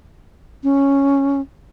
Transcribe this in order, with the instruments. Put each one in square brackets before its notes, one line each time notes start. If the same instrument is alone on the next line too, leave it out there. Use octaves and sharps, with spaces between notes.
[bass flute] C#4